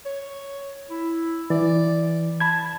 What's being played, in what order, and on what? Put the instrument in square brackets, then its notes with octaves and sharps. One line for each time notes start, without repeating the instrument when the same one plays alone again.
[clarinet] C#5
E4
[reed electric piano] E3 [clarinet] D5
[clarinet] A5 [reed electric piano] B5 G#6